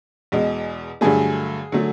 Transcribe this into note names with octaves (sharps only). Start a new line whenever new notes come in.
E2 B2 G#3
G2 D3 F#3 A3 G#4
D3 F#3 A3